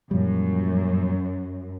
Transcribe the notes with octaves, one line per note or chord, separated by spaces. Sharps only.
F#2 A#2 F3 G3